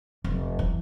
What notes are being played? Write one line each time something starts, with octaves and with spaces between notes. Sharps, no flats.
F1
E3